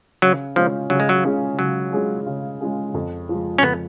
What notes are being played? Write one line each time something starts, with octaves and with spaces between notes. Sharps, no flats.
C#3 F#3
F3 G#3 C#4 F4 G#4
C#3 F#3
G#3
F#3
G#3 C#4 F4 G#4
C#3 F#3
G#3 C#4 F4 G#4
C#3
G#3 C#4 F4 G#4
F2
F3 G#3
C#4
F2 B3